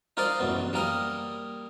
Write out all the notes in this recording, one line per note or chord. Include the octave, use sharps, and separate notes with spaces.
D#4 F4 A#4 C5 D5 D#5
A1 F#2 B3
G3 A#3 A#4 D#5